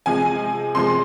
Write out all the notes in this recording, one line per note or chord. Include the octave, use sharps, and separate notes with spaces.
C3 F3 G#3 G#5
C3 F3 G#3 C6